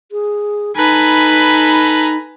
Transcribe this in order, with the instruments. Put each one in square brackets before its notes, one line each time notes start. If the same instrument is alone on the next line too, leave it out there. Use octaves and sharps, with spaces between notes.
[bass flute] G#4
[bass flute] D#4 [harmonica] A4 A#5 B5 [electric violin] B4 G#5